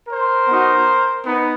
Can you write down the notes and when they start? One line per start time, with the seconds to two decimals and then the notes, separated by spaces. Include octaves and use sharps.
0.08 A#4 C5
0.47 B3 D#4 F#4
1.26 B3 D#4